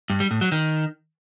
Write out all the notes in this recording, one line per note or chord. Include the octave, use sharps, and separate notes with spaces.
G2
G3
A2
F#3
D#3